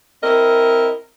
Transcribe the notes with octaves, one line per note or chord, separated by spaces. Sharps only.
C4 E4 A#4 D#5